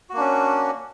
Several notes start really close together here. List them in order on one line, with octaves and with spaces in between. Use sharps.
F#4 A#3 D4 C#4